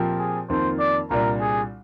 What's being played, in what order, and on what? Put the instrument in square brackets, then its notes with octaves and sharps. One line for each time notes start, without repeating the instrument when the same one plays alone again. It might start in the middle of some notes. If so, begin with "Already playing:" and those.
Already playing: [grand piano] A#2 F3 C4 G4 A#4
[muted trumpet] G#4
[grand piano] F2 D#3 A#3 [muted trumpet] C5
[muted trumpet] D5
[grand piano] C2 A#2 G3 D4 [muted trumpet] A#4
[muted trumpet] G#4